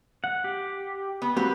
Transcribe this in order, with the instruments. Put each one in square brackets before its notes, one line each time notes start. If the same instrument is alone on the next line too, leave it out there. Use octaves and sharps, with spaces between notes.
[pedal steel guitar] F#5
G4
[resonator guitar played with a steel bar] B3
[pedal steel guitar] A#3 C4 F#4 [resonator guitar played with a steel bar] G4 B4